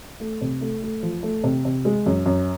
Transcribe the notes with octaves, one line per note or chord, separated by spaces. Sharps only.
A3
C3
A3
A3
F3
A3
C3
C3
G#3
F#2
F#2